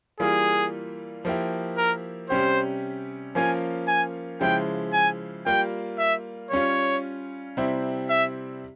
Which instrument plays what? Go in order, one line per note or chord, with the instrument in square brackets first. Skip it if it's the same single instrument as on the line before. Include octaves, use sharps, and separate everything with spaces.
[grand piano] E3 G3 A#3 F4 [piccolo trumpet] G#4
[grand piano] F3 A#3 E4 G4
[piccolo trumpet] A#4
[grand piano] C3 G3 C#4 G4 [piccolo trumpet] C5
[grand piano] F3 A#3 C#4 F4 [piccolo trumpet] G#5
[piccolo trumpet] G#5
[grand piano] C#3 F3 G#3 E4 [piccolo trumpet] G5
[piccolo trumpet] G#5
[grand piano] G3 A#3 F4 [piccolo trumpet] G5
[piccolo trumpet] E5
[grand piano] G3 C#4 F4 [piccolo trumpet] C#5
[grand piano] C3 G3 C4 E4 G4
[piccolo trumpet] E5